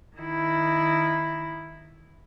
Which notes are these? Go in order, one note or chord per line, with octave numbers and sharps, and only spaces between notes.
D#3 E4